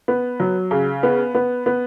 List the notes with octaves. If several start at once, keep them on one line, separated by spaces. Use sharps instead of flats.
B3
F#3
C#3
B3
B3
B3